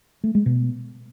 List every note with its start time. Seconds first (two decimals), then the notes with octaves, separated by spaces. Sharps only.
0.24 A3
0.35 G#3
0.46 B2